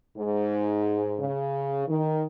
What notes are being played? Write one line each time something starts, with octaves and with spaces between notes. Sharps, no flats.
G#2
C#3
D#3